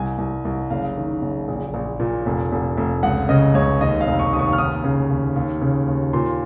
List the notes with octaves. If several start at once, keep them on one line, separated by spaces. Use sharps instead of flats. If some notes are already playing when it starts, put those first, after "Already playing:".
Already playing: C2 G#5
C2
C2
F#1 F5
D#3
F#1
A#1
A#1
A#2
F1
F1
F1
C#2 F#5
C#3 D#5
C#2 C#5
D#2 D#5
F5
F1
C#6
D#2 D#6
C#6
F6
D#2 D#6
C#3
D#2
D#2
C#3
D#2
A#2 C6